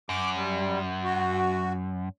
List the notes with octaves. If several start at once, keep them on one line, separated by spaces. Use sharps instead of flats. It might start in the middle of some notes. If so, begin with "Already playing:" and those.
F#2 D6
G3
F#4